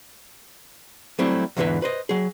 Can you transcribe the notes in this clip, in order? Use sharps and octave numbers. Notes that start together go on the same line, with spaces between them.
F#3 G3 A3 C4 E4 G4
E2 G#2 D3 E3 B4 E5
B4 C5 D#5
F#3 G#4